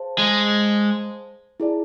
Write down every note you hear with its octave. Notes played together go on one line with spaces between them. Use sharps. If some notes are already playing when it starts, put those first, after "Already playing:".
Already playing: G#4 C5 F5 A5
G#3
E4 G#4 D5 A5